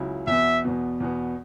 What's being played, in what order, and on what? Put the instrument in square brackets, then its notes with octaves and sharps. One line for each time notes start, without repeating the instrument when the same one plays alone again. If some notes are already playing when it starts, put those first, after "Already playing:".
Already playing: [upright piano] C#2 C#3 F#3 E4
[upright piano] E2 B2 B3 [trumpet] E5
[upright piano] E2 B2 B3
E2 B2 B3